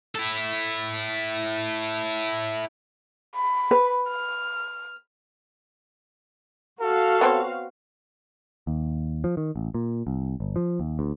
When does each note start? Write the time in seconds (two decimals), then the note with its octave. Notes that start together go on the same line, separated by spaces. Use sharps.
0.15 E4 A4
3.36 B5
3.71 B4
4.10 F6
6.80 F#4 A4 F5
7.21 B3 C4 C#5
8.67 D#2
9.24 F3
9.37 D#3
9.56 A1
9.75 A#2
10.07 C2
10.40 G1
10.56 F3
10.80 D#2
10.99 D2